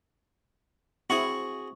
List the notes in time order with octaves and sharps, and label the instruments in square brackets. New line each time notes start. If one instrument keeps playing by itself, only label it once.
[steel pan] C4 E4 [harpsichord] F#4 G#4 [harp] C#6